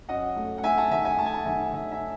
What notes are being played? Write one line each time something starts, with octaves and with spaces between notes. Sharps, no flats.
F#2 D#5 F#5
A3
F#5
A3 E5 G#5
F#5 A5
D#3 E5 G#5
E5 G#5
A3 A5
G#5
F#5 A5
D#3 E5 G#5
D#3 E5 G#5
E5 G#5